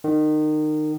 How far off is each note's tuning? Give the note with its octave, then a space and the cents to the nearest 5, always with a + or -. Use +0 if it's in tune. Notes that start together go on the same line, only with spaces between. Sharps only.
D#3 -25